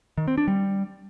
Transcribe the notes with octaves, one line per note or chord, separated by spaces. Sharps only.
D#3
C4
D4
G3